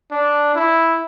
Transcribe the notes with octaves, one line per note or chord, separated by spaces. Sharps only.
D4
E4